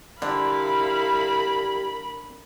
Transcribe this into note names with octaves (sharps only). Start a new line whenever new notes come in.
D3 G3 E4 A#4 F5 B5